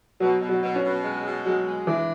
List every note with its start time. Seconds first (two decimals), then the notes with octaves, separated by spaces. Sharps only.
0.20 B2 F#3
0.41 B2
0.49 F#3
0.62 B2
0.76 C#4
0.83 B2
1.04 G#3
1.26 B2
1.45 F#3 G#3
1.67 G#3
1.87 E3 D4